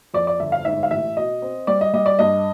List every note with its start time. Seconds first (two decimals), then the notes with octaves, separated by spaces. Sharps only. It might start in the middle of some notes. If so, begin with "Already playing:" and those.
0.14 F2 D5
0.27 D5
0.40 G1 E5
0.52 F5
0.65 G#2 E5
0.83 F5
0.91 A1 E5
1.17 B2 D#5
1.42 C4
1.67 G3 D5
1.81 D#5
1.94 G3 D#5
2.06 D5
2.19 G2 D#5